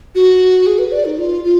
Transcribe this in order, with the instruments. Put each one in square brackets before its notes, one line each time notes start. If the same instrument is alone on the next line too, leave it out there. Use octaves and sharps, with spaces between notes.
[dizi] F#4
G#4
B4
D5
D#4
F4
F4